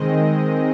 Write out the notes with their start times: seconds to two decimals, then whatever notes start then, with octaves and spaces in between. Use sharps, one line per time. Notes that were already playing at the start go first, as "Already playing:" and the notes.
Already playing: D#3 G#3 C4 D#5